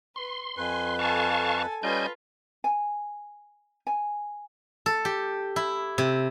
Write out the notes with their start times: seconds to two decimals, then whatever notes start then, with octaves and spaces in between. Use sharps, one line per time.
0.16 B4 C6
0.57 F2 B4 G#5
0.99 A4 F5 G#5 A5 C#6
1.83 G3 C#4 F4 B4 D#5 G#5 G6
2.64 G#5
3.87 G#5
4.86 A4
5.05 G4
5.56 E4
5.98 C3